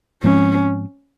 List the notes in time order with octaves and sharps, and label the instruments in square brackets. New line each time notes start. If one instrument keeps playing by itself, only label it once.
[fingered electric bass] G#2 F3 G#3 C4 [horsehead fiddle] C#4